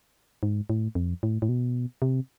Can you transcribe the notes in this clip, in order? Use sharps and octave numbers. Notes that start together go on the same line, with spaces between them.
G#2
A2
F2
A2
A2
B2
C3